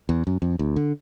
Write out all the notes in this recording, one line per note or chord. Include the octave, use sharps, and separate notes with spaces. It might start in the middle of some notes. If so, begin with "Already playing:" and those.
E2
F#2
F2
D2
D3